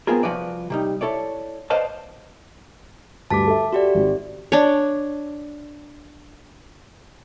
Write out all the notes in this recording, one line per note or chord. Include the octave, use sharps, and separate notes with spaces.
B3 C4 F4 G#4 A#4
C2 F2 F3 F#4 B4 D5
C3 G3 D#4
E4 A4 C#5 D5
B4 C5 D5 D#5 F5 A5
D2 G2 A5 D6 B6
A4 E5
F#4 G4 D5
G#1
D4 C#5